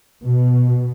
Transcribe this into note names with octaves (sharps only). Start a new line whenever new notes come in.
B2